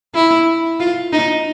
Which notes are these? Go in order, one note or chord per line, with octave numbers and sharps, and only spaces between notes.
E4
F4
D#4